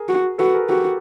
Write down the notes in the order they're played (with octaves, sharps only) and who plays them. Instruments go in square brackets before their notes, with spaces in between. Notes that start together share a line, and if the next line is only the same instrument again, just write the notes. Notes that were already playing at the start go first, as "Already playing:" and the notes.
Already playing: [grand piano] G#4 A#4
[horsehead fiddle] F#4
[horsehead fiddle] F#4 [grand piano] A4 B4
[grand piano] G#4 A#4
[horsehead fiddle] F#4 [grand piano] G4 A4